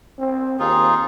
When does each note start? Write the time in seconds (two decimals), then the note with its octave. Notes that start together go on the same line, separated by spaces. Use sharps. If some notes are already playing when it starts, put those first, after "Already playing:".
0.18 C4
0.59 D#2 D#4 F4 G#4